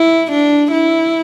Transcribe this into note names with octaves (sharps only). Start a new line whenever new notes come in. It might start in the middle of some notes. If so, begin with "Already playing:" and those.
Already playing: E4
D4
E4